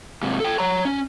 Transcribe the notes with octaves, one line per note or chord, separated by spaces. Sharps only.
G#2 C3
A4 G5
C#5 A#5
C#4